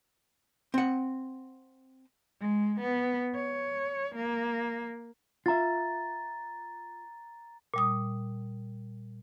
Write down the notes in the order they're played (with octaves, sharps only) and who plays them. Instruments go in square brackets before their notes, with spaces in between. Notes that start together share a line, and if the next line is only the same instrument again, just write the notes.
[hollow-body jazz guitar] C4 F#5
[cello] G#3
B3
C#5
A#3
[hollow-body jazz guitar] F4 E5 [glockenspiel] A#5 A6
[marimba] A#2 G3 D#6